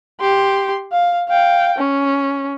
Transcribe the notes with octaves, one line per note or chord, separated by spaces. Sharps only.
G4 C6
F5
F5 G5
C#4